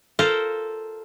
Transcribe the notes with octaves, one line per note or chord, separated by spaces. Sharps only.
F4 A4 A#4 C5